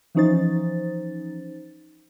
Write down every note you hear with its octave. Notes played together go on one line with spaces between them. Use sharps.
E3 F3 C#4 D#4 C5 A6